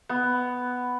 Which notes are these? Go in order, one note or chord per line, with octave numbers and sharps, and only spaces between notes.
B3